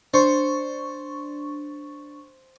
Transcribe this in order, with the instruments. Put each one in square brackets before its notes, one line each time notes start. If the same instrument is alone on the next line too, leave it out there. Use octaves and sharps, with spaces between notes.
[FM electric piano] D4 C#6 [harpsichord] C5